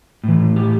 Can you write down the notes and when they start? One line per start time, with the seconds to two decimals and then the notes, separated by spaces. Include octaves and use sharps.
0.24 A2 E3
0.56 G4